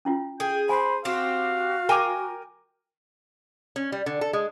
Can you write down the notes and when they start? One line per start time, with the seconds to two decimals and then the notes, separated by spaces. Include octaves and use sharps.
0.05 C#4 E4 F4
0.40 G#4 A4 G5
0.69 C5 G#5 B5
1.05 C4 F#4 G4 F5
1.89 A#4 G5 G#5 A#5 D6
3.76 C#4
3.92 G3
4.06 D3
4.21 A4
4.33 G#3